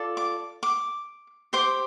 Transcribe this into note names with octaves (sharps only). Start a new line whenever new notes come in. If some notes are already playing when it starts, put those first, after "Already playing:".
Already playing: F4 A4 D5
D6
D6
G4 C5 D6